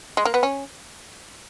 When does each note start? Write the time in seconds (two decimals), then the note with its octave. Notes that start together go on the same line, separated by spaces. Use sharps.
0.17 G#3
0.25 A#3
0.34 B3
0.43 C#4